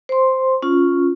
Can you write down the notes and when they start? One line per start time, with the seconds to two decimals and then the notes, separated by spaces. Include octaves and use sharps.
0.09 C5 C6
0.62 C#4 F4